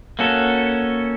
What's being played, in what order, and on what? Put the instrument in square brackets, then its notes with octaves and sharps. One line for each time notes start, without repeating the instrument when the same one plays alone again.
[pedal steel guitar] A#3 C#4 F#4 A4